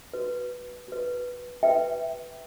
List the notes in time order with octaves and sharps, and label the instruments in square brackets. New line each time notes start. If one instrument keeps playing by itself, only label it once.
[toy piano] F#4 B4
F#4 B4
F#4 B4 E5 G5